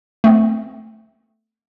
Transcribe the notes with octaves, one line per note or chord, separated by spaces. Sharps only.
A3 B3 C4